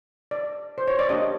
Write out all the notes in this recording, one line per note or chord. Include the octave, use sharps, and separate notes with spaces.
D5
C5
C#5
D5
A#3 D4 G4 D#5